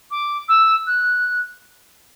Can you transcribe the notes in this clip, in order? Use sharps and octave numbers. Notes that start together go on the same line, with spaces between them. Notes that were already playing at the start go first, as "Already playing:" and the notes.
D6
E6
F#6